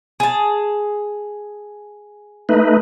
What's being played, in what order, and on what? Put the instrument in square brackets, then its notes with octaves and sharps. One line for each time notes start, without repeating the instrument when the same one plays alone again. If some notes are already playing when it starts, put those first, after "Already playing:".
[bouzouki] G#4 A5
[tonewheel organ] A3 D#4 B4